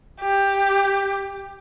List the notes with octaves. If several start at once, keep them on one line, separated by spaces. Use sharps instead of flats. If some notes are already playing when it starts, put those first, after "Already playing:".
G4